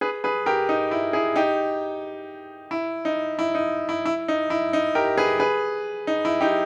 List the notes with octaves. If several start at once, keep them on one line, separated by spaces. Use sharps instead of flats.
G#4 B4
G#4 B4
G4 A#4
D#4
E4
E4 G#4
D#4 G4
E4
D#4
E4
D#4
E4
E4
D#4
E4
D#4
G4 A#4
G#4 B4
G#4 B4
D#4
E4
D#4 G4